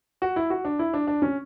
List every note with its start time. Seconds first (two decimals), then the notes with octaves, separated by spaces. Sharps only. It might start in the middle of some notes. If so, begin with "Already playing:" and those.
0.22 F#4
0.36 E4
0.50 F#4
0.65 D4
0.79 E4
0.94 D4
1.07 D4
1.22 C#4